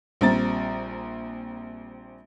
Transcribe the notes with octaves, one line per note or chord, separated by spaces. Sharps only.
A#1 G3 C4 A#5 A6